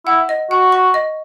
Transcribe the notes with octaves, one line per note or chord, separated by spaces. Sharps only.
E4 F#5
D#5
F#4 F#5
C#6
D#5